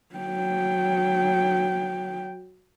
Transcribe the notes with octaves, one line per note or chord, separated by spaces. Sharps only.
F#3 G5